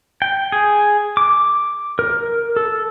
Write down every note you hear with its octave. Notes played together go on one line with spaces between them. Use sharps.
G5
G#4
D6
A#4
A4